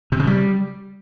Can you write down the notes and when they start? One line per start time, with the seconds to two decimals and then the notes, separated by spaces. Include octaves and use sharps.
0.12 C3
0.19 C#3
0.27 G3